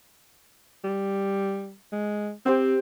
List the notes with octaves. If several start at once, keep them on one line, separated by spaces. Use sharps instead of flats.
G3
G#3
C4 G4 C5 G5